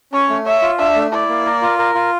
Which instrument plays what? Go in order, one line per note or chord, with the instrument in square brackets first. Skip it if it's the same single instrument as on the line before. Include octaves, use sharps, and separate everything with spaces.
[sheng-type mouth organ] C#4 [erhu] C#5
[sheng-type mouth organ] A3
[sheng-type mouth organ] C#5 [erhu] E5
[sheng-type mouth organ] F4
[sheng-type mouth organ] D4 [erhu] E5
[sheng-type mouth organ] A3
[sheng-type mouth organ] E4 [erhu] D5
[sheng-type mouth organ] A#3
A#4
F4
A#4
F4